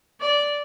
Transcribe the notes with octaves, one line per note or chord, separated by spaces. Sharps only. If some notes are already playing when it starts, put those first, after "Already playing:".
D5